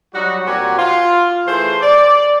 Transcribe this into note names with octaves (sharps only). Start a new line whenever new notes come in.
F#3 G3 D#4 F#4
A#2 C4 F#4 G4 G#5 A#5
F4
E3 A3 G#4 C5
D5